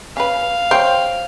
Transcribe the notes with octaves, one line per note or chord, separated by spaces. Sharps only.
C#4 B4 F5
C5 C#5 G5